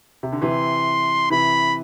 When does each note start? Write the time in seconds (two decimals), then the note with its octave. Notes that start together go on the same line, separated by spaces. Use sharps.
0.23 C3
0.32 D3
0.41 C3 E3 C6
1.30 C3 E3 B5